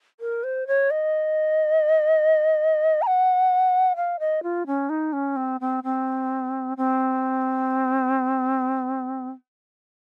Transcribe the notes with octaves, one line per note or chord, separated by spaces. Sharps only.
A#4
C5
C#5
D#5
A#5
F#5
F5
D#5
F4
C#4
D#4
C#4
C4
C4
C4
C4